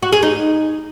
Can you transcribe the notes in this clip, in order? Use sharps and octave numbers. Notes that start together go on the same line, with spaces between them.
F#4
G#4
D#4